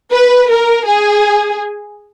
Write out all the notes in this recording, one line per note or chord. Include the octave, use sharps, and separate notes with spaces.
B4
A#4
G#4